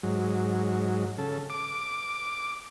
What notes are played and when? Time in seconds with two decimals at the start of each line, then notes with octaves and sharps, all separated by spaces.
0.03 G#2 F#3
1.18 C#3 A4
1.50 D6